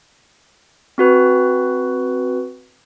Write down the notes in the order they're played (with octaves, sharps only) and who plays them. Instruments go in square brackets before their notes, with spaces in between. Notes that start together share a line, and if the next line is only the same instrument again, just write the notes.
[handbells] C4 F#4 B4